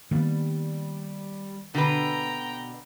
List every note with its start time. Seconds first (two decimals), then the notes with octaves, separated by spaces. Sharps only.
0.11 D#3 G3 A#3 B3
1.75 B2 D3 B4 G5 A#5